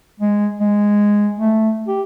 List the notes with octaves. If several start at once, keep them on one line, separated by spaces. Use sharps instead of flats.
G#3
G#3
A3
G4